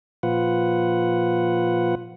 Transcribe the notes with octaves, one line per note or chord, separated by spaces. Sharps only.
A#2 F3 F4 B4 F#5